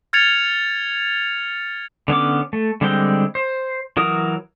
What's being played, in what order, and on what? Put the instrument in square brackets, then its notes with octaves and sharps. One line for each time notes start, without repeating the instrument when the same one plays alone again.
[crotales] F6 G#6 A6 C#7 F7
[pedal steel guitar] D3 B3 C#4 D6
A3
D3 G3 G#3 C4 G5
C5
E3 F#3 A#4 D#6